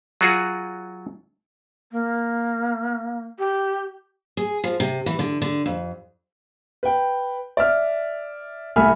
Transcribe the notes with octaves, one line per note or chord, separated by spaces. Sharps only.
F#3 F4 F#4 G#4
A#3
G4
G#4
F3
C3
E3
D3
D3
F2
B4 G5
D5 E5 F6
C2 A3 E5 G#5 B5 F6